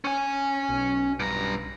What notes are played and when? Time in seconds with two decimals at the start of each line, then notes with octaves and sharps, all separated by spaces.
0.04 C#4 G#5
0.69 B1
1.20 G2 A#5